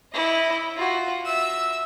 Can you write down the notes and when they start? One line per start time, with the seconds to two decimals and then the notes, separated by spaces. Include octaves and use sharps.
0.13 E4 D#5
0.76 F4 F#4
1.25 E5 E6